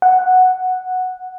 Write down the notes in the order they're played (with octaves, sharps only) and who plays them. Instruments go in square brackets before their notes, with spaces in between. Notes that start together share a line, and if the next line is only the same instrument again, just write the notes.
[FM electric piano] F#5